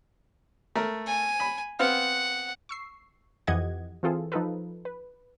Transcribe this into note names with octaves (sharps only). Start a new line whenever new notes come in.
A3 A#4
G#5
B5
B3 C4 F5 F#5
C#6 E6 C7
F2 E3 G4 D#5 F#5 G#6
E3 C4 F4 G#4 A4
F3 D#4 F4 A4 B4
B4